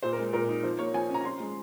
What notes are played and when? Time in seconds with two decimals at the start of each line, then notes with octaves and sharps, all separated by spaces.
0.03 A#2 C5
0.13 A#4
0.18 G#3
0.33 A#2 A#4
0.49 D#4
0.63 F3 C5
0.79 A#3 C#5
0.94 F3 G#5
1.10 C#4 A#5
1.21 A#5
1.25 F3 C6
1.40 G#3